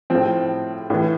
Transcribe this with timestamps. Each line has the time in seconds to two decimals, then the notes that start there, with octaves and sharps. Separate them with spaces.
0.10 A2 F3 C4
0.90 A2 E3